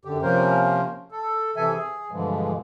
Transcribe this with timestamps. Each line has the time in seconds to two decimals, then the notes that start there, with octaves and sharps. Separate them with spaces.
0.05 F#2 D3 G4
0.22 C3 F3 A#3 C#4 A#4 C5
1.12 A4
1.56 C3 E3 A4 E5 G#5
1.74 G#4
2.11 G2 B2 D3 E3 F3 G#3